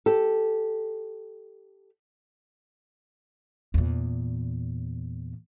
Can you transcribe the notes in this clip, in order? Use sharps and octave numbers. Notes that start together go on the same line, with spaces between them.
G4 A4
E2 A#2